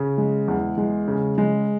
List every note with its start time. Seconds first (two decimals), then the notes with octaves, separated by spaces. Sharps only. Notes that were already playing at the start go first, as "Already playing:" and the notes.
Already playing: C#3
0.18 G#3
0.48 E2
0.78 G#3
1.08 C#3
1.38 G#3